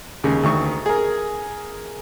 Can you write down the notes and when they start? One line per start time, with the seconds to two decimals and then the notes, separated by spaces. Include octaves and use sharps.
0.24 D#2 C#3 G#3
0.43 D2 D#3 C#6
0.86 G#4 A#4